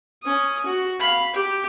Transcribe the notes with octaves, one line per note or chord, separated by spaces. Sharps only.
C#4 D#6
F#4
F5 B5
G4